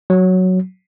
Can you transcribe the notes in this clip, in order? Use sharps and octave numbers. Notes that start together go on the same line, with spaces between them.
F#3